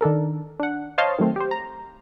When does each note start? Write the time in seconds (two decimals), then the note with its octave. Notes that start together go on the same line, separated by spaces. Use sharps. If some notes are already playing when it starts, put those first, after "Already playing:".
0.01 D#3 D4 A4 A#4
0.60 D4 F#5
0.98 C5 C#5 D#5 F5 A5 C6
1.18 D#3 F#3 A3 C4
1.36 G4 C5
1.51 A#5